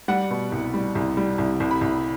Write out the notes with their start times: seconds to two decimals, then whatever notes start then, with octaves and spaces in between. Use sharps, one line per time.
0.08 G3 F#5
0.31 B2
0.52 C2
0.74 G3
0.95 C2
1.17 G3
1.38 C2
1.60 C2
1.71 B5
1.81 C2